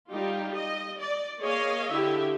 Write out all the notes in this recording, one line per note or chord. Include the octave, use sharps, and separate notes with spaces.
G3 D#4 F4 G4
D#5
D5
A#3 G#4 C#5 D#5 F5
D3 E4 G4 E5